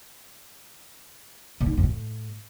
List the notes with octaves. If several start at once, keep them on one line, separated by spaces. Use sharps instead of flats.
A#2
D#3
E2
F2
A2